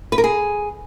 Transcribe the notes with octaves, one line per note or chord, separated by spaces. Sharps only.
B4
A#4
G#4